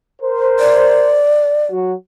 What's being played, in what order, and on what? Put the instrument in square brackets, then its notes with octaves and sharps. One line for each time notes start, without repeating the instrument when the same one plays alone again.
[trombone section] A#4 C5
[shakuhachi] D5
[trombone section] F#3 F#4